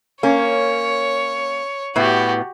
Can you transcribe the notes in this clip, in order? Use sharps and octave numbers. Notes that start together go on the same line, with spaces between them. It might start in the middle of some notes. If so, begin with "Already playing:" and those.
A#3 C#4 C#5
A2 B3 F#4 G4